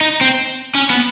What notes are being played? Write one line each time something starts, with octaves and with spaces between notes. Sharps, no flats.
D#4
C4
C#4
B3